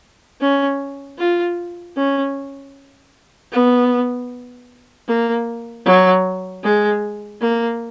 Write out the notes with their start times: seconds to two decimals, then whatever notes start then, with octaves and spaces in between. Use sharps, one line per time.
0.41 C#4
1.19 F4
1.97 C#4
3.52 B3
5.08 A#3
5.86 F#3
6.64 G#3
7.41 A#3